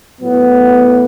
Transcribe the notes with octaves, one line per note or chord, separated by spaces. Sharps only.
A2 F#3 B3